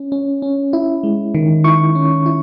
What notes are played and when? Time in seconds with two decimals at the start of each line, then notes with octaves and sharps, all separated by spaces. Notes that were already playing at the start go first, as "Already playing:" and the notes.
Already playing: C#4
0.12 C#4
0.42 C#4
0.73 E4
1.03 G#3
1.35 D#3
1.64 E4 C#6
1.95 C#4
2.26 E4